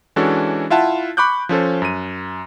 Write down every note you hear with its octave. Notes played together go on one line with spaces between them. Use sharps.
E3 G#3 C#4 D4 F#4 A4
E4 F4 E5 F#5 A5
B5 C#6 D6 F#6 G6
F3 C#4 A4 C5
F#2 D#7